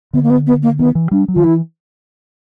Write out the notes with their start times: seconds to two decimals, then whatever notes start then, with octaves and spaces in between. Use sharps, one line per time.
0.13 D3 B3
0.23 A#3
0.30 B3
0.47 B3
0.63 A#3
0.78 D#3 B3
0.95 E3
1.11 G3 D4
1.28 F#3
1.35 D#3 F4
1.44 E3 E4